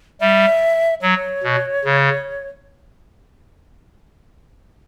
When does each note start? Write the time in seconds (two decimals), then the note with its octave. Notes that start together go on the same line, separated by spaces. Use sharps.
0.21 G3 E5
1.02 F#3 C#5
1.44 B2
1.85 C#3